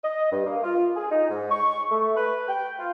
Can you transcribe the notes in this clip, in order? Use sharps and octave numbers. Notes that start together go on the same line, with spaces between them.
D#5
G2
A#3
F4
G#4
D#4
G#2
C#6
A3
B4
G5
F4